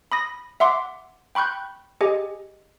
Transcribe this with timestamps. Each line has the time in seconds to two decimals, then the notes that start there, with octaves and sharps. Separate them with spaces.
0.12 B5 D#6 A#6
0.60 E5 F#5 C6 D6
1.35 G5 B5 C#6 F#6 G6
2.01 G4 G#4 D#5 G#5